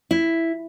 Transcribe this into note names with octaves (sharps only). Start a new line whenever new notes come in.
E4